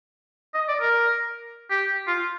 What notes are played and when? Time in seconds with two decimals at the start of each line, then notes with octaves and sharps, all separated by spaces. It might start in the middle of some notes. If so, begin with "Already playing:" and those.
0.55 D#5
0.69 D5
0.81 A#4
1.70 G4
2.08 F4